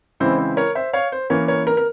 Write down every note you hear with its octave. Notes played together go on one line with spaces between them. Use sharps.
C#3 E3 G#3 C4 E4 C5
C5
A#4 C#5
C5 E5
C#5 F5
C5
E3 A#3 C#4 A#4 C#5
A#4 C#5
A#4
A#4